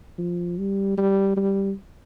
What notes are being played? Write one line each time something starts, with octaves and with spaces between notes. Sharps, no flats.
F3
G3
G3
G3